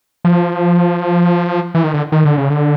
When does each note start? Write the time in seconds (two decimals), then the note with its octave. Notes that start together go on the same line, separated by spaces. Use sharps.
0.25 F3
1.75 E3
1.84 D#3
1.94 D3
2.12 D#3
2.25 D3
2.38 C#3
2.50 D3